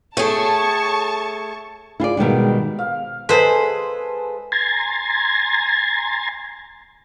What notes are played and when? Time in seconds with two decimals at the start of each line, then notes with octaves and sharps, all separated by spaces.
0.17 A3 G#4 A4 C#5 G5 A5 C#6
2.00 E4 F4 G#4 D5
2.17 B2 D#3 G3 G#3
2.79 F5
3.29 G#3 A4 B4 C5 G#5
4.52 G#5 A#5 C6 G#6 A6